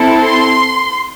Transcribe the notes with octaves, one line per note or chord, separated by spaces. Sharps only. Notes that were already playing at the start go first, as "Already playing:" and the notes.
Already playing: C4 E4 A4
C6